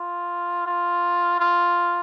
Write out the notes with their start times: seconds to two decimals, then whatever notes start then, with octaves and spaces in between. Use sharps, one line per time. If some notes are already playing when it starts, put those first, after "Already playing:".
Already playing: F4
0.66 F4
1.40 F4